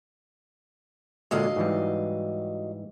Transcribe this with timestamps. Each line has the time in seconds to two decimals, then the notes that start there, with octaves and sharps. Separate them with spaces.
1.31 A#2 D3 F#3 G#3 D#5 F5
1.56 G#2 E3 G3